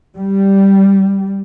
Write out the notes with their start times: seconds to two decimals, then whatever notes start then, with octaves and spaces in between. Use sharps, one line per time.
0.16 G3